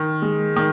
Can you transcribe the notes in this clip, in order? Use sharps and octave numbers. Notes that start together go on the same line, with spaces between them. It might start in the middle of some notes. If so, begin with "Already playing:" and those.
Already playing: D#3
G#3
D#3